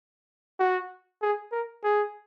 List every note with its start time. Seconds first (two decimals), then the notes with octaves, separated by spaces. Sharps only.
0.60 F#4
1.22 G#4
1.52 A#4
1.84 G#4